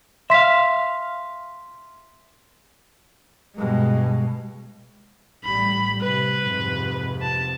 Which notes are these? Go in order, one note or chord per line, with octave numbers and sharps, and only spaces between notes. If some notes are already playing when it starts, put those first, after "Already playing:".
E5 F5 C6 B6
G2 B2 G#3
A1 A2 G3 B5
C3 B4
F2 G#2 C3
A5